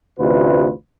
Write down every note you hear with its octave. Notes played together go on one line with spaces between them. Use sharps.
A1 D2 C3 F4 B4